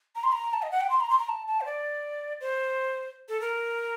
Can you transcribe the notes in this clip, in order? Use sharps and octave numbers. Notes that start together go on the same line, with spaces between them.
A#5
C6
A#5
A5
D#5
F#5
G5
C6
A#5
C6
A#5
A5
A5
C5
D5
C5
A4
A#4